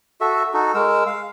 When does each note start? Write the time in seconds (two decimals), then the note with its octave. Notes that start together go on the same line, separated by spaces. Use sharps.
0.21 F#4 A4 E5
0.54 D#4 F#4 A4
0.74 G#3 A#4 E6
1.06 F5